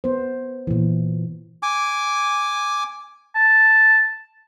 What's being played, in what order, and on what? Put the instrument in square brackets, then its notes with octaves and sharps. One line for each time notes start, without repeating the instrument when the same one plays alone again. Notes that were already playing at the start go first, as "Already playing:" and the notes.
[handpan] B3 C5
A#2 E3
[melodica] G#5 D6
[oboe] A5